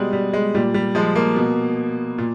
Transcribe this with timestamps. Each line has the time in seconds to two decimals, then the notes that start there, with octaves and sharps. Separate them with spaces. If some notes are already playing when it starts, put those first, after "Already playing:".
Already playing: B2 G3 G#3
0.13 G3
0.33 G#3
0.55 A#2 G3
0.74 G3
0.95 F3 G#3
1.16 A#3
1.36 B2
2.18 A#2